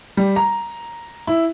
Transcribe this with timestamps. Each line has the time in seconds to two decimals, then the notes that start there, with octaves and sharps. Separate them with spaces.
0.17 G3
0.36 A#5
1.27 E4